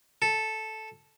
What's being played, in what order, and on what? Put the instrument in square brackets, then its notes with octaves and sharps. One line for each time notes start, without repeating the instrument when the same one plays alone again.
[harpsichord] A4